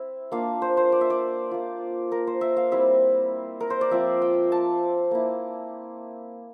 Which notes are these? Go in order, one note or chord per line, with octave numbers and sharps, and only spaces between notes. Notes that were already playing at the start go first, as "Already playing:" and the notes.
Already playing: C4 E4 E5
A#3 D4 F4 F5
C5
C5
D5
E5
D5
A#3 F4
A#4
C5
E5
F5
G3 C4 E4 E5
A#4
C5
D5
F3 C4 F4 E5
G5
A5
A#3 E4